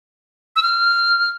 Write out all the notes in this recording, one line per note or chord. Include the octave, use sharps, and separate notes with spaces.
E6
F6